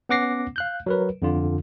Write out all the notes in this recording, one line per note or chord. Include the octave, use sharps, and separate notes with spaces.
B3 C#4 F#5 D6 A#6 C7
F5 F#6 G6
F#3 A#4 B4
F2 D3 F4